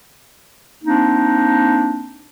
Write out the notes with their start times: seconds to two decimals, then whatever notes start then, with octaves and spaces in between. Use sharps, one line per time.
0.83 A#3 C4 D4 D#4